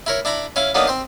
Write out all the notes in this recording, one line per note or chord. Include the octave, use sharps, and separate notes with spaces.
E4 A#4 C#5
D4 E4 A#5 B5
C#4 E4 F5
F#3 A#3 B3 D4 D#4
C4 C5